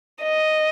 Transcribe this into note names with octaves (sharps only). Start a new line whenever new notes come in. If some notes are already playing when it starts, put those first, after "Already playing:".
D#5